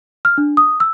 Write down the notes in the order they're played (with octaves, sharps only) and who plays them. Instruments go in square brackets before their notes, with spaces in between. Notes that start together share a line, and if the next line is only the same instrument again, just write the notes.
[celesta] F6
D4
D#6
E6